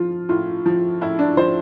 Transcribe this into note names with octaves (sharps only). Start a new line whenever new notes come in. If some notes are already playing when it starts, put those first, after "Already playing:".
Already playing: F3 F4
A2 F4
F3
A2 E4
D4
F3 C5